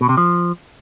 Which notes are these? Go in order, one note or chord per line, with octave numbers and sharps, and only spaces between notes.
B2
C3
F3